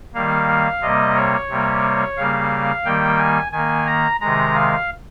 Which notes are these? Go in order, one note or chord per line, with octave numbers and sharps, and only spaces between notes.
D#3 G3 A#3 F5
C3 G3 A#3 D#5
C#5
C3 G3 A#3
C#3 G3 A#3 F5
D#3 G3 A#3 G5
G#5
D#3 A#3 G#5
A#5
C3 D#3 G#3 A#5
F5